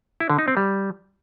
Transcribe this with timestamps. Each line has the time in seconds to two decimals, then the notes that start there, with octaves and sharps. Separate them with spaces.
0.20 E4
0.30 D3
0.39 D#4
0.48 C4
0.57 G3